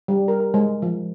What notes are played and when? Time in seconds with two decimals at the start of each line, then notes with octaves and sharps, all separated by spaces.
0.08 G3
0.28 A#4
0.40 A#4
0.54 G#3
0.82 F3